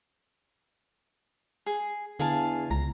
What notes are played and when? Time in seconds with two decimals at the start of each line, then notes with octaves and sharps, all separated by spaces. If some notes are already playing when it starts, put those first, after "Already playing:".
1.66 G#4
2.19 E2 D3 G#4 F5 A5
2.71 C#2 A#5